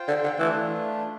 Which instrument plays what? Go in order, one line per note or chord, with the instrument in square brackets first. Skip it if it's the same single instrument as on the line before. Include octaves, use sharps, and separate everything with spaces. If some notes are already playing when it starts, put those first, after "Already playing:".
Already playing: [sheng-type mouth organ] F4 C5 G5
[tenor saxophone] D3
D3
[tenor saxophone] E3 [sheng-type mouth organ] A3 D4 F4